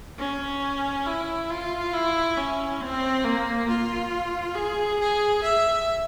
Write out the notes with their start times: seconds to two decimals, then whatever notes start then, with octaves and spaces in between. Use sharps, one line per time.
0.19 C#4
1.06 E4
1.50 F4
1.94 E4
2.37 C#4
2.81 C4
3.25 A#3
3.68 F4
4.55 G#4
5.00 G#4
5.43 E5